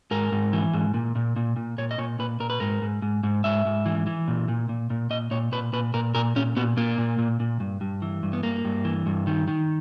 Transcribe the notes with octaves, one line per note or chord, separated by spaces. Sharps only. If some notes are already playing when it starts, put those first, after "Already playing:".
G#2 A#4
G#2
E3
G#2
A#2
A#2
A#2
A#2
A#2 C#5
D#5
A#2 C#5
A#2 B4
A#2 A#4
B4
G#2 A#4
G#2
G#2
G#2
G#2 E5
G#2
E3
E3
A#2
A#2
A#2
A#2
A#2 D#5
A#2 C#5
A#2 B4
A#2 B4
A#2 A#4
A#2 A#4
A#2 C#4
A#2 B3
A#2 A#3
A#2
A#2
A#2
G2
G2
E3
G2
B3
G2 A#3
G2
E3
G2
D#3
D#3